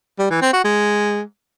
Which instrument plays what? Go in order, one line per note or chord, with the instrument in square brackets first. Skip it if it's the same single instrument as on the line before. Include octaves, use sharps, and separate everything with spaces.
[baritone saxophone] G3
E3
C4
F#4
G#3